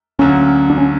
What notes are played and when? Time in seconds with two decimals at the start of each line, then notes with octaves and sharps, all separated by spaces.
0.19 D2 D3 F#3 A#3 C#4
0.70 D4
0.78 C#4